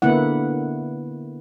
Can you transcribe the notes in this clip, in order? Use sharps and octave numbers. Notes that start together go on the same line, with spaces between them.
D3 A#3 B3 E4 F#5